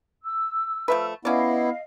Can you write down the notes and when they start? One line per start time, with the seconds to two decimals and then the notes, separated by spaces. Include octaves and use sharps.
0.24 E6
0.88 F3 A3 B4
1.25 B3 C#4 E4 D5 D#5 F5